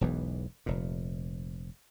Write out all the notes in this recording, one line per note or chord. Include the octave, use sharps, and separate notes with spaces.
E1 B1 E2 E3
F1 A#2